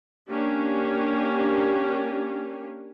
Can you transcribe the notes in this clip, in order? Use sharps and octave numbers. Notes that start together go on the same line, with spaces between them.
A#3 C#4 D4 G4